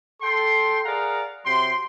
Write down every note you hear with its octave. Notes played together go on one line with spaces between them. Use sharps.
A4 G5 C6
G#4 A#4 D5 F5 F#5 A#5
C3 F#3 G5 C6